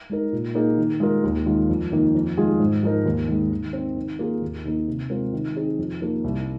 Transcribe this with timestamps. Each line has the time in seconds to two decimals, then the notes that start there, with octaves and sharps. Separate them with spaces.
0.10 G#3 D#4 A#4
0.32 A#2
0.55 A#3 D#4 G#4
0.78 D#3
1.00 G#3 F4 A#4
1.24 D#2
1.46 D#3 G#3 F4
1.69 F2
1.92 D#3 A#3 D#4 A#4
2.15 F2
2.37 D#3 G#3 F4 G#4
2.60 G#2
2.83 F3 G#3 D#4 A#4
3.06 D#2
3.28 D#3 G#3
3.51 D#3
3.73 C4 D#4
3.97 D#3
4.19 A#3 F4 G#4
4.42 D#2
4.65 D#3 A#3 D#4
4.87 C3
5.10 G#3 C4 F4 A#4
5.33 D#3
5.56 C4 D#4 G#4
5.79 F2
6.00 F3 A#3 D#4
6.24 C2